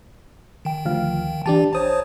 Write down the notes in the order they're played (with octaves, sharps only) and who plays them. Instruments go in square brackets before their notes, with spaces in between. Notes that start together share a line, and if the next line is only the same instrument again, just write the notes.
[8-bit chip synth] D#3 G5
[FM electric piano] D2 F3 F5
[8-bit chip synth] E3 [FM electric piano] D4 G4 A5
[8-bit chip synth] A1 C5 C#5 [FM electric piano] A5 D#6